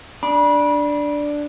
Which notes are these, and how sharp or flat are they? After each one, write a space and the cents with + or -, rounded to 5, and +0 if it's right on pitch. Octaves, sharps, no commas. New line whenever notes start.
D4 +0 B5 -30